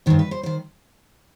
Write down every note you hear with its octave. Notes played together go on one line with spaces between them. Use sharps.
G2 D#3 C5
B4
C5
D#3 C5